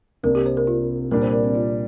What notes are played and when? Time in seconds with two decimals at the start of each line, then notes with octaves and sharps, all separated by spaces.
0.23 C2 C3 A#3 D4 A#4
0.35 G4
0.46 C5
0.57 A#4
0.67 F4
1.11 A#2 G3 D4 A#4
1.22 C5
1.32 A#4
1.44 C4
1.55 F4